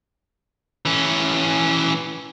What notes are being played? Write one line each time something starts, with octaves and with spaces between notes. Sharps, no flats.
E3 C#4